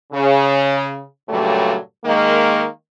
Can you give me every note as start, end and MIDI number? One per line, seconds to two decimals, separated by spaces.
0.13 1.00 49
1.28 1.75 43
1.28 1.75 46
1.28 1.75 49
1.28 1.75 54
1.28 1.75 55
1.28 1.75 57
2.04 2.64 51
2.04 2.64 56
2.04 2.64 58